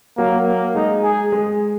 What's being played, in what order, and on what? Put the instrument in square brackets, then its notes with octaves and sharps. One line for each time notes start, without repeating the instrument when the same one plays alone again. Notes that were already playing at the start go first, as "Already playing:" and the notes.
[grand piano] F#3 [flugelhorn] A#3
[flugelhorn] A#3
[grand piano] G#3 [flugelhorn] D#4
[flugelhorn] G#4
[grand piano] G#3